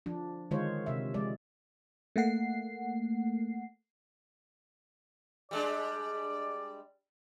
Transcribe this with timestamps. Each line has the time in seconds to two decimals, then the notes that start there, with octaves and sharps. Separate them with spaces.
0.06 F3 D4
0.51 D3 D#3 G#3 F4 C5 C#5
0.86 C3 E5
1.14 F3 G#3 D5
2.16 A3 A#3 F#5 C7
5.51 G3 G#3 D4 D5